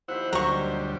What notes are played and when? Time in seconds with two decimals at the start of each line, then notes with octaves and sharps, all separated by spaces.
0.08 D#2 F3 E4 C5 F#5
0.33 D2 F#3 G3 C#5 D#5 A#5 C#6